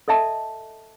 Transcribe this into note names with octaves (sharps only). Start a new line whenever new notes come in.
A4 D#5 E5 A5